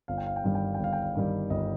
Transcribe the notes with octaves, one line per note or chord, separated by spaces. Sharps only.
G1 F5
G5
F5
G5
G2 D#3 G3 F5
G5
F5
G5
G1 F5
G5
F5
G2 D#3 G3
G1 D#5